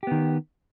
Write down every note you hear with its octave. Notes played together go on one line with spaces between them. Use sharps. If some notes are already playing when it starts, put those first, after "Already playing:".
D#3 B3 G4